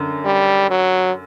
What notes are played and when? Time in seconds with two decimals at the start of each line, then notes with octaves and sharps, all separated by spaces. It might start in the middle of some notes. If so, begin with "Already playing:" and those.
Already playing: F#2 D3
0.25 G3
0.70 F#3